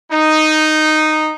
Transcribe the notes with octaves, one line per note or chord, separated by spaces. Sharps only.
D#4